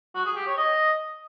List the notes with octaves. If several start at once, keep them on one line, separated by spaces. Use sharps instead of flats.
F#4
G#4
G4
C#5
D#5